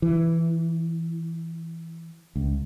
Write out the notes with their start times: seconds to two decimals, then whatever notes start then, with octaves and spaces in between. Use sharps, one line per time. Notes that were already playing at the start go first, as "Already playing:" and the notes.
0.02 E3
2.36 C#2